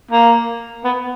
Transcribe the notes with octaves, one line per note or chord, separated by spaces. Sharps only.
A#3
B3